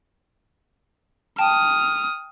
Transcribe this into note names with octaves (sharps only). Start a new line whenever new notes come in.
G5 A5 D#6 F6